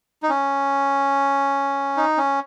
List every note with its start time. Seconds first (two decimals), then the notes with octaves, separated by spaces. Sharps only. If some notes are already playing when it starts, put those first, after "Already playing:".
0.23 D#4
0.29 C#4
1.97 D#4
2.18 C#4